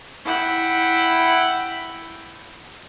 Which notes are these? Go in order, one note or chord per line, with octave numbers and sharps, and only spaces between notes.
E4 F#5 G5